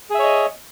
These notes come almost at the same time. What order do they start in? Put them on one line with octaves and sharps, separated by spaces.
G#4 E5 C#5 D#5